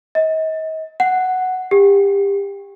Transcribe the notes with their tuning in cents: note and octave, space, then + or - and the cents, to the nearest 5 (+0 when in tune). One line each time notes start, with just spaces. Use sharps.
D#5 +35
F#5 +0
G4 +25